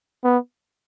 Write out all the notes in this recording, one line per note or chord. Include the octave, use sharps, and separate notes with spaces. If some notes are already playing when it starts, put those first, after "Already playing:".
B3